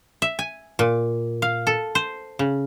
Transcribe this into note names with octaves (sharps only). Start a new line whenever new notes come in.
E5
G#5
A#2
F5
A4
C5
C#3